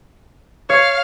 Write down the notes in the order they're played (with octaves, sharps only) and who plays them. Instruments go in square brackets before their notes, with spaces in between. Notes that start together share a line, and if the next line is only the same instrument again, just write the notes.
[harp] C#5 [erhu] F5